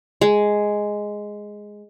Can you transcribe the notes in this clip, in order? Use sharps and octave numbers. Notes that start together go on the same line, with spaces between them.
G#3